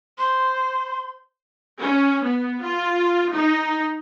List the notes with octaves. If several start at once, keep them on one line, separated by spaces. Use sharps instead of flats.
C5 C6
C#4
B3
F4
D#4